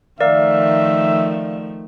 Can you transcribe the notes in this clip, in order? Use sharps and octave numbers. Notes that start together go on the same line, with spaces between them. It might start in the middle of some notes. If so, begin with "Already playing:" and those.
D#3 F3 A3 A#4 D5 E5 F5